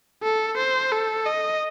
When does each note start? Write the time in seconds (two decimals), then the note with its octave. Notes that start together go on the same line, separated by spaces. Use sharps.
0.23 A4
0.58 C5
0.92 A4
1.26 D#5